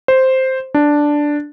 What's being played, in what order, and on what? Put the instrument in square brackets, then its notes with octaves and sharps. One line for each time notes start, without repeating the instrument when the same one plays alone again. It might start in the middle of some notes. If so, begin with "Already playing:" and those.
[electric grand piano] C5
D4